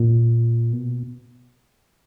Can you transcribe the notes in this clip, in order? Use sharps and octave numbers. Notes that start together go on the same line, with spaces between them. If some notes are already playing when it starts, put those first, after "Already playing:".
Already playing: A#2
B2